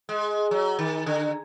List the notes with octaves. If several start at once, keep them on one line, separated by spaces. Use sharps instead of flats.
G#3
F#3
D#3
D3